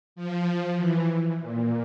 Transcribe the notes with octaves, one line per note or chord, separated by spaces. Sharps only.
F3
E3
A#2